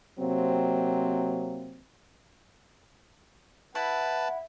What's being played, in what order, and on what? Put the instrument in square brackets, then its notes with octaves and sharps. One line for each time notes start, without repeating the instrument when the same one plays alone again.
[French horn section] C3 F#3 A#3 C4
[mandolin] E4 [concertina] B4 A5 [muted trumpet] F#5